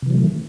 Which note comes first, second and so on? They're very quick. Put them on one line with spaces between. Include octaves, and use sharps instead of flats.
C3 E3 F#3 A3 D#3